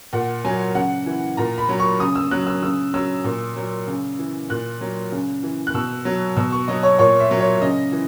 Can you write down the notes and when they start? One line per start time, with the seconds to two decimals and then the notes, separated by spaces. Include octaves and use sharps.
0.13 A#2 F#5
0.45 F#3 G#5
0.75 C#3 F#5
1.06 E3
1.37 A#2 A#5
1.58 B5
1.69 F#3
1.80 C#6
2.00 C#3 D#6
2.15 E6
2.31 F#3 F#6
2.47 E6
2.62 C#3 E6
2.94 F#3 E6
3.24 A#2
3.56 F#3
3.88 C#3
4.19 E3
4.50 A#2 F#6
4.81 F#3
5.12 C#3
5.43 E3
5.67 F#6
5.74 B2 E6
6.05 F#3
6.37 B2 E6
6.52 C#6
6.68 F#3 D#5
6.83 C#5
6.99 A#2 C#5
7.20 E5
7.31 F#3
7.41 C#5
7.62 C#3 D#5
7.92 E3